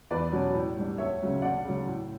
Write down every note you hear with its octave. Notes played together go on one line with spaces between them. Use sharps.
E2 B4 D5
B2 F#3 C#4
A2
G3 D4
D2 C#5 E5
C#3 F#3 C#4
D2 D5 F#5
C#3 F#3
A2